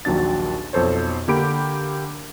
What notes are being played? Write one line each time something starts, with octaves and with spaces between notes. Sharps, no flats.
A#1 D#2 F#3 D4 A6
B1 F2 A4 C5 C#5
D3 A#3 G4 B5 D7